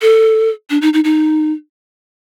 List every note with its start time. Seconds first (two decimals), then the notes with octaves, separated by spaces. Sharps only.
0.02 A4
0.70 D4
0.82 D#4
0.93 D#4
1.04 D#4